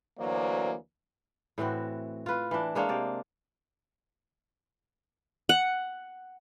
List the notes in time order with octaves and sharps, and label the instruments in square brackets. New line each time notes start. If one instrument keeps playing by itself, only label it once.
[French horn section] D2 E3 F#3 A#3 C5 D5
[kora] A2 E3 C4 F#4
F4 B4
E3 D4
G#3 A#3 D4 C#5
C3 D5
[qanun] F#5